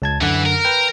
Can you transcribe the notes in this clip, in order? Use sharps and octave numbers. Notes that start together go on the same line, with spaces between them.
C#2 A5 G#6
F#2 D3 E3 F#5
A#4
B4 G5